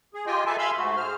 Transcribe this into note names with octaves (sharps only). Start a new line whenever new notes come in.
G#4
F4 G4 D#5 G5 G#5
G#4 A4 B4 E5 G#5 A5
E5 F5 G#5 B5 C6 E6
G#2 A3 F#4
G#4 C5 F6